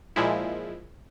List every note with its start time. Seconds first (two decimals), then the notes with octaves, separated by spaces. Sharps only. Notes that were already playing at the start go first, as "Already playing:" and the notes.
0.16 A#2 F3 G#3 E4